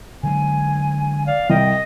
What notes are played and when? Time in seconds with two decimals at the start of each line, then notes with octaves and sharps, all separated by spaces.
0.23 D3 F#3 G#3 G#5
1.26 D5 F5
1.50 C2 D#5 G5